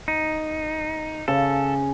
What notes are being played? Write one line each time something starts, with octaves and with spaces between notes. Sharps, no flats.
D#4
C#3 A4